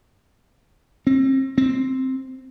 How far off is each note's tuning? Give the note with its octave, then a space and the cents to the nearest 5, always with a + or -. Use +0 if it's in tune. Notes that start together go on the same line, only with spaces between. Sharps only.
C4 +35
C4 +0